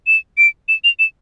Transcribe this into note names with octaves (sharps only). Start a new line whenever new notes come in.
E7
D7
E7
F7
E7